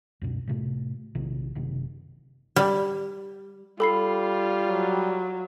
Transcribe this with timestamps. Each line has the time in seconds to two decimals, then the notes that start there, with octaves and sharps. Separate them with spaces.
0.22 C#2 F#2 B2
0.48 A2 C3 A3
1.15 A#1 C3 D#3
1.55 F#1 C3 D#3
2.56 G3
3.80 G3 F4 A4 B5 C7
4.67 F#3